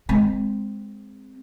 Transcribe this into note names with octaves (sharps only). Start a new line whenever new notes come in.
G#3 C4